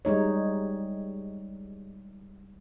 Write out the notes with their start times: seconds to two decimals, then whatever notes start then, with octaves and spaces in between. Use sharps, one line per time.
0.05 G3 G#3 D#4 C#5